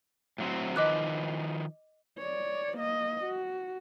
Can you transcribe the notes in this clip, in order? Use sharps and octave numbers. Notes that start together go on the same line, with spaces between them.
A2 F#3 C4
D#3 F3 B4 D#5 D6 F#6
C#5 D5
A#3 D#5
F#4